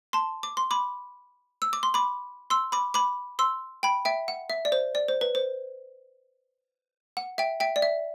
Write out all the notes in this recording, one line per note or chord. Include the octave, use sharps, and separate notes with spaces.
A5 C6
D6
C6
B5 D6
E6
D6
C6
B5 D6
C6 E6
B5 D6
B5 D6
C6 E6
G5 B5
E5 G5
F#5
E5
D5
C5
D5
C5
B4
C5
F#5
E5 G5
E5 G5
D5
E5